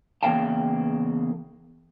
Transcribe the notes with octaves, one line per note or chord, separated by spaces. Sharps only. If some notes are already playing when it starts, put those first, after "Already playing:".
E2 C#3 A#3 F5 G5 A5